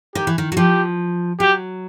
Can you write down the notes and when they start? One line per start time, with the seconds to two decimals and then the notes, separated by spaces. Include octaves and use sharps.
0.15 D#3 G4
0.27 E3
0.38 D#3
0.52 F#3
0.57 F3 G4
1.40 F#3 G4